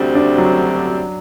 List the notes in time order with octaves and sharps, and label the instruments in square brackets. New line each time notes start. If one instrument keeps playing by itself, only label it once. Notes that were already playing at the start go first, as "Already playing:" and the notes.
Already playing: [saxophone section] D2 C3 G3 C4
[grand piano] D4
F#3